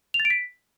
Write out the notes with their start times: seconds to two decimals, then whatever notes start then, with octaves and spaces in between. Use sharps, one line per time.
0.14 F7
0.20 A6
0.25 D7
0.30 B6